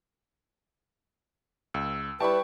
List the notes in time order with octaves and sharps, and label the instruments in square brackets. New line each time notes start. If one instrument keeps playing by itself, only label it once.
[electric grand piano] C#2 [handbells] E6
[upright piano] G3 E4 D5 [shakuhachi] B4 [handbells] G5 C#6 [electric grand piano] A5 B5